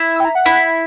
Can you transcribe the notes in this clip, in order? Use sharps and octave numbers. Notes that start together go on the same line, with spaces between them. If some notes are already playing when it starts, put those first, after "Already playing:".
Already playing: E4
E6
G5
A#5
F#5
E4